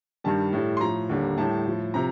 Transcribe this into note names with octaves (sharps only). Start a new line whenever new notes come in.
G2 D#3 G3 A5
A2 G3
C6
A2 F3 A#5
D#2 D3 G3
A2 G3 A5
A2 F3
C3 F3 A#5